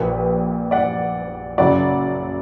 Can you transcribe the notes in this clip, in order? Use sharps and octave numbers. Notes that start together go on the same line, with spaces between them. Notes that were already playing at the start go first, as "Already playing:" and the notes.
Already playing: A#1 A#2 A#3 G4 B4
D5 F#5
F#1 F#2 C#3 F#3 D5 F#5